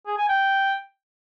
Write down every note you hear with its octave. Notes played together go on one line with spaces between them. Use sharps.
G#4
G#5
G5